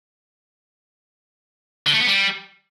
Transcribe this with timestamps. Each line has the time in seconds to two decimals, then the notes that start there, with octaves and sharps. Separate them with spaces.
1.86 D3
1.93 A3
2.00 B3
2.07 G3